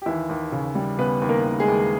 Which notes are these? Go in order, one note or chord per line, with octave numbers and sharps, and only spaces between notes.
G4
D#2 E3 E4
D#2
C#3
G3
C#3 B3 B4
D#2
A#3 A#4
D#2
G#3 G#4
D#2